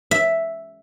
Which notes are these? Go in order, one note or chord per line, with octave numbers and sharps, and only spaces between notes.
E5